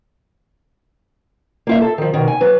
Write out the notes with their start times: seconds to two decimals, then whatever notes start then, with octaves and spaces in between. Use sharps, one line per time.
1.67 A#3 F4 E5
1.82 A4
1.98 D#3 F3
2.14 B2 D#3
2.28 G#5
2.41 F#3 B4